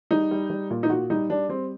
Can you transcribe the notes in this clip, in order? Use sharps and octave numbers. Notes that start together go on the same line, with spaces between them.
G3 D#4
G3
G3
A#2
D#4
A#2 F#4
G3 D#4
G3 D4
G3 C4